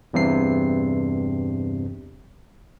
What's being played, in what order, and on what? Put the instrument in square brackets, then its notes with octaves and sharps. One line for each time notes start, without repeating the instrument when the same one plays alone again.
[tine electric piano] E2 G2 C3 C7